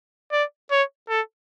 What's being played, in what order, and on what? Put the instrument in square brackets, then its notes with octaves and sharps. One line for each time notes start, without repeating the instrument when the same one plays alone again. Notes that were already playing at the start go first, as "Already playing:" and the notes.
[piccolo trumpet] D5
C#5
A4